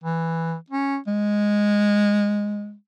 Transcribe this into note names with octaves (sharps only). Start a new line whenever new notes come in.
E3
C#4
G#3